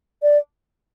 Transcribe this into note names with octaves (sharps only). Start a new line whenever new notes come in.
D5